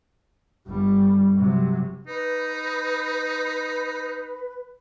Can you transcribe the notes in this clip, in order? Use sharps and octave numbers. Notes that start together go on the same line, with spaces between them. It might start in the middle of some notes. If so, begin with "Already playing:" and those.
G1 G3
C3 F#3
D#4 B4